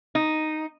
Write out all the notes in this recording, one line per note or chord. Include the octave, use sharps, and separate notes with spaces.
D#4